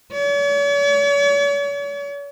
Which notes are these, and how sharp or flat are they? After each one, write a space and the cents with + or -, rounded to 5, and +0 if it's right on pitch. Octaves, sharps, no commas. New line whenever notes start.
C#5 +45